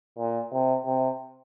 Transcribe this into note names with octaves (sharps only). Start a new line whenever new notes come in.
A#2
C3
C3